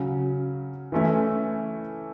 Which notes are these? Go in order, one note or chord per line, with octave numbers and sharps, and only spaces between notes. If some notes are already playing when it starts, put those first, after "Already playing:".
Already playing: C#3 F#3 C#4
E3 A3 C#4 E4